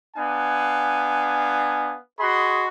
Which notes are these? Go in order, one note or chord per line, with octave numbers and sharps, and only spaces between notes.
B3 D4 F5 G#5
F#4 G#4 D#5 B5 C6